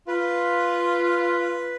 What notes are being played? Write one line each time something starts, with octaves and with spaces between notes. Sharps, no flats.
F4 B4